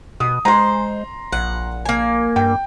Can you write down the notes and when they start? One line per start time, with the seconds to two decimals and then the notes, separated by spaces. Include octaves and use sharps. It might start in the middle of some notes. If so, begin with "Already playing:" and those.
0.20 B2 D#6
0.45 G#3 C5 A#5 C6
1.33 A#1 F#5
1.86 A#3 G#5
2.36 G2 G5